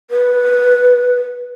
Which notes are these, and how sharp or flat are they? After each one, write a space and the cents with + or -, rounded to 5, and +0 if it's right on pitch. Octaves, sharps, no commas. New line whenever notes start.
B4 -10